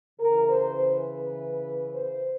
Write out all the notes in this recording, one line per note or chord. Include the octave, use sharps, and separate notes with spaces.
C#3 E3 A#4
C5
B4
C5